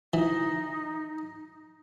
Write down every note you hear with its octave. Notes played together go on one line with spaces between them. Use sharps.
E3 D#4